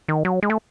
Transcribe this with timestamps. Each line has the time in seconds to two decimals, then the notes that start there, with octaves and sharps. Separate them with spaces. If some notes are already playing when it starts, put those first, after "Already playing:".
0.08 D#3
0.25 F#3
0.43 G#3
0.50 A3